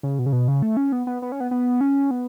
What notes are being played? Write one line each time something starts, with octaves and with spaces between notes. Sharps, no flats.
C#3
B2
C#3
B2
C#3
A3
C#4
B3
B3
B3
C#4
B3
B3
C#4
B3